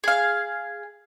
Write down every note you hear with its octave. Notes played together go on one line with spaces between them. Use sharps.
G#4 F5